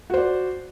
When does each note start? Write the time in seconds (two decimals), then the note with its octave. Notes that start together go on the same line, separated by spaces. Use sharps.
0.10 F#4
0.14 C5
0.18 D5